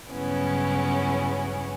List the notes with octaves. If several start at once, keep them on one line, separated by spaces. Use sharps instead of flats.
G2 C#3 F#3 B3 C#4 E4